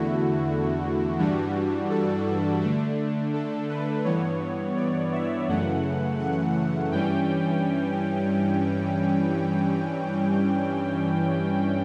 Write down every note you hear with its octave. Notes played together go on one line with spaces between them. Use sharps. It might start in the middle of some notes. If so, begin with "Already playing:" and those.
Already playing: E2 D3 A3 E4 F#4
G2 E3 G3 D4 F#4
A4
D3 A3 D4
A4
B4
G2 E3 B3 C#5
D5
E5
F#2 C#3 E3 A3 F#5
F#5
G2 E3 G3 C#4 G5